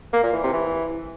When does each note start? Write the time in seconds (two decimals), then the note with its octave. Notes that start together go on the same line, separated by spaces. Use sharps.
0.13 A#3
0.23 A#2
0.33 E3
0.43 C3
0.53 E3